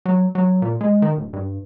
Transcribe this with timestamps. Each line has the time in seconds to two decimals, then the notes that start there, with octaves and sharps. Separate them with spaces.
0.06 F#3
0.35 F#3
0.62 A#2
0.81 G#3
1.02 D#3
1.17 D1
1.33 G2